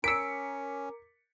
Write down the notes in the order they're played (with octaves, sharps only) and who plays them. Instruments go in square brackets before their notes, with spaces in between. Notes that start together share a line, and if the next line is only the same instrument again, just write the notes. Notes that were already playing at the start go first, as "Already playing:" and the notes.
[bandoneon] C#4 [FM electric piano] A#4 D6 [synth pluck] E6 D7 [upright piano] B6 C#7